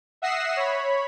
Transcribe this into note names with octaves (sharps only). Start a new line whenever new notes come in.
E5 F#5 D#6 A#6 C7 E7
C#5 B5